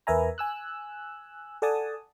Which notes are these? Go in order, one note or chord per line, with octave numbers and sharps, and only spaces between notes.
E2 A#4 B4 E5 G#5 A#5
G#5 E6 F#6
A4 D5 F#5 G#5 A5 D#6